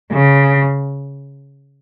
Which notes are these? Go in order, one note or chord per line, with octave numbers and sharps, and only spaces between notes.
C#3